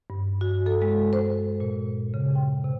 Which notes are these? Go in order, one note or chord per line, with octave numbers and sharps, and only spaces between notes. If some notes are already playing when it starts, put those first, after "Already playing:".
G2
F#4
A4
G#3
C5
A#2
C#3
G5
C3